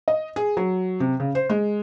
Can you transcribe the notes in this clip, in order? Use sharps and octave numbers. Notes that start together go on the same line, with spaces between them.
D#5
G#4
F#3
C3
C#3
C5
G#3